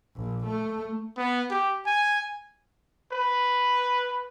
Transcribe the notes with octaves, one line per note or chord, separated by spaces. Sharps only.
A#1
A3
B3
G4
G#5
B4